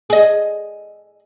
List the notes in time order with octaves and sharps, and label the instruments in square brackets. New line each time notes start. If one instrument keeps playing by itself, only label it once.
[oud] G#4 D#5